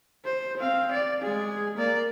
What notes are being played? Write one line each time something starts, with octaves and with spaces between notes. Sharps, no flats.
C5
C4 F5
D5
G#3 G#4
A#3 D5